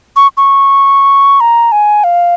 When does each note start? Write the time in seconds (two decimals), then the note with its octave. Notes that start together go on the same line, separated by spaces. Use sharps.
0.16 C#6
0.37 C#6
1.40 A#5
1.72 G#5
2.04 F5